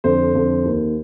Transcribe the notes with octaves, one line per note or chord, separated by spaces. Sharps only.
F2 D3 C5
F2 D3
D#2 D#3